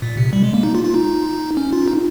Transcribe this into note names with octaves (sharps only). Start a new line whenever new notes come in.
A#2
C3
G3
G#3
A#3
D#4
F4
F4
D#4
C#4
F4
D#4